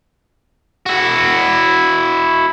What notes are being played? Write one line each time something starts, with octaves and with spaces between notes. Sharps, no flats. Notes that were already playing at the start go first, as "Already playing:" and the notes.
E4 F#4